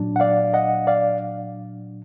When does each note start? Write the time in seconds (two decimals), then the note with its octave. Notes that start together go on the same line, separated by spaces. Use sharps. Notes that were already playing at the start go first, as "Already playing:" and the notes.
Already playing: A#2 F#3 D4
0.16 F#5
0.20 D5 F5
0.54 D#5 F#5
0.87 D5 F5